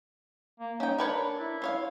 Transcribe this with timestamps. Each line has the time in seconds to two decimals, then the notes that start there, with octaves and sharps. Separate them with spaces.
0.60 A#3
0.80 C#4 D#4 G5
0.98 D4 A#4 B4 C#5
1.39 E4
1.62 F4 C#5 F5